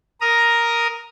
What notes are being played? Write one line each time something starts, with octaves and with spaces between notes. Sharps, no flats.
A#4 A#5 D#6